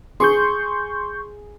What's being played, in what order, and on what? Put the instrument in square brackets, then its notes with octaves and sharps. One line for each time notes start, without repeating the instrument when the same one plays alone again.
[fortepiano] G#4 [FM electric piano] C6 C#6 G6